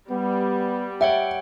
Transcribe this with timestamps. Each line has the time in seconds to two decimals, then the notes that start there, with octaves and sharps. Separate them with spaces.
0.10 G3 B3
1.01 C#5 E5 F#5 G5